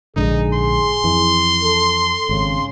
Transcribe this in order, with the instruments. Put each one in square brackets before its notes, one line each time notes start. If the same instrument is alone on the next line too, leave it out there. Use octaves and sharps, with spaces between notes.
[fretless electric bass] A#1 G#2 D3 [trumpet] D#4 [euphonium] G#4
[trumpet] C6
[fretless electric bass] F2 E3
[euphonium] A4
[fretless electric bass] G#1 [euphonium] C#3